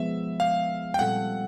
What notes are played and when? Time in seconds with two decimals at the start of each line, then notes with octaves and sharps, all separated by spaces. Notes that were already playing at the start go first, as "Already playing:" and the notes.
Already playing: F3 G#3 B3 E5
0.40 F5
0.94 G5
0.99 A#2 G3 C4 F4 A4 F#5